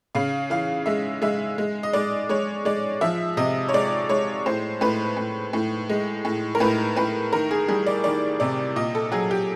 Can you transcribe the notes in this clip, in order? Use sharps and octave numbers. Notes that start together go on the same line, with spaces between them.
C#3 F5
E3 F5
G#3 E5
G#3 E5
G#3
D#5
G#3 D5
G#3 C#5
G#3 D5
F3 E5
C3 D#5
C#5
G#3 D5
G#3 C#5
A2 C5
A2 B4
A2
A2
G#3
A2
A#4
A2 B4
A2 B4
D#3 A#4
G#4
G3 G#4
D5
D#3 D5
C3 D5
A#2 D#5
A4
F#3 G#4
G4